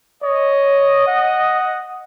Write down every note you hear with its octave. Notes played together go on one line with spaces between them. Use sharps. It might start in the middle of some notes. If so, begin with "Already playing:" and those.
C#5 D#5
F#5